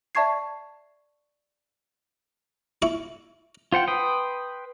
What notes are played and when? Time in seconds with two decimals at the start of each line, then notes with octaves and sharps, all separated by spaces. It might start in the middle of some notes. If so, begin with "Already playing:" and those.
0.15 D5 E5 A5 C#6 G#6 C7
2.82 E4 C#6
3.72 F4 C5 F#5 G5
3.88 B4 G5 C6 D#6